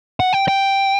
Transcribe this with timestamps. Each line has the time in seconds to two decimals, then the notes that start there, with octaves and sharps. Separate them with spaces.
0.20 F#5
0.33 G5
0.48 G5